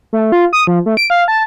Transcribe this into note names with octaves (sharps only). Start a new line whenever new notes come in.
A3
F4
D#6
F3
A3
D7
F5
A5